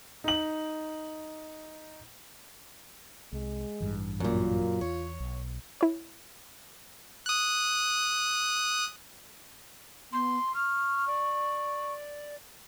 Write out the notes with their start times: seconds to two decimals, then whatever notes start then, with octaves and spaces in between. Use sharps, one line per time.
0.24 D#4 F#7
3.33 C2 G#3
3.80 A1 G2 E3
4.20 F#2 A#2 F4
4.81 E2 C#5
5.20 B1
5.81 E4 C#5
7.26 D#6 F#6
10.12 B3 C6
10.54 C#6 F6
11.07 D5